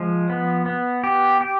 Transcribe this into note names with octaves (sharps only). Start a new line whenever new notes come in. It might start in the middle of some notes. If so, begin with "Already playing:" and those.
Already playing: F3 G#3
B3
B3
G4
G4